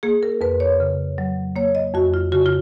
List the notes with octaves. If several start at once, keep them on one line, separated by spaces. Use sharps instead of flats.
A#3 G#4
A#4
F2 B4
C#5
C#3
F#3
A#3 C#5
D#5
F2 F#4
F4
C#3 F#4
F4